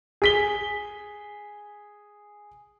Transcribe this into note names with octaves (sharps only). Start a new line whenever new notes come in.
G#4 B6 G7